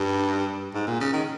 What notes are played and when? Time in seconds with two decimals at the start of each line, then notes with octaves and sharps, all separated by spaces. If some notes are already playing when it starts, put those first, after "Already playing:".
Already playing: G2
0.75 G#2
0.87 A#2
1.01 C#3
1.13 D#3